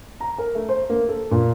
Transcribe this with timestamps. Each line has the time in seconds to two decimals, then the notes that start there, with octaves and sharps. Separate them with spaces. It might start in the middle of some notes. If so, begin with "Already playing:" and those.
0.21 A#5
0.38 A#4
0.55 A3
0.69 C5
0.90 A#3
1.09 A4
1.31 A#2